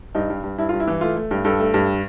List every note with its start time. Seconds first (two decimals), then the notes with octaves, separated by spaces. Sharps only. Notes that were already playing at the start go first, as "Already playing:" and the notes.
0.15 G2 D#4
0.30 G2
0.44 G2
0.58 G2 E4
0.69 G2 F4
0.80 E4
0.88 E3
1.01 A3 F4
1.16 A3
1.31 G2
1.45 G2 A4
1.60 A3
1.74 G2